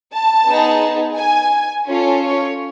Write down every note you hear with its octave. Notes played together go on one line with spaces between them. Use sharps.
A5
B3 D#4 G#4
G#5
C#4 F4 A4
C#5